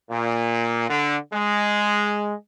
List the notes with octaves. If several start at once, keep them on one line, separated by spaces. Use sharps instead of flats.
A#2
D3
G#3